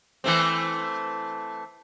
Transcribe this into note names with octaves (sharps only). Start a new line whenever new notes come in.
E3 A3 C4